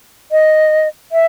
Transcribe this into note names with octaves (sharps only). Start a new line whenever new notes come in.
D#5
E5